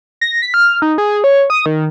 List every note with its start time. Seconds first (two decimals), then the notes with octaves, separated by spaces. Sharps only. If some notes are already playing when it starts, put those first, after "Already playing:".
0.21 A#6
0.42 B6
0.54 F6
0.82 D#4
0.98 G#4
1.24 C#5
1.50 D#6
1.66 D#3